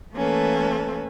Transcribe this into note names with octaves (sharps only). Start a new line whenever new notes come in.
E3 A3 A#3 C#4 A4 B4